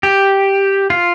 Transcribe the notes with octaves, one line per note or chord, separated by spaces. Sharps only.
G4
F4